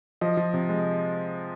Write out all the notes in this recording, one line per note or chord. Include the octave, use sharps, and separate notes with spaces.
F3 D#5
F3
C3
G#3